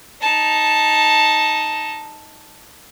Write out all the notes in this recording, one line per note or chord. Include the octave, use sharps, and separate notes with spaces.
D#4 A5